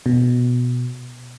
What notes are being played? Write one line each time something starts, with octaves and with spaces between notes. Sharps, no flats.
B2